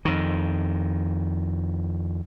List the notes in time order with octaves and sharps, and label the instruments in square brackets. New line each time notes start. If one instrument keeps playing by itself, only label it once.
[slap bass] F2 D#3